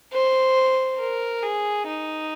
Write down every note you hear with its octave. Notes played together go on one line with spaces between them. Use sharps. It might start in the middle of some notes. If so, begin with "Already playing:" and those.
C5
A#4
G#4
D#4